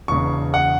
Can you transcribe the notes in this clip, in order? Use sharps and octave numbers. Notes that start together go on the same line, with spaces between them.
E1 E2 C#3 C#6
F#5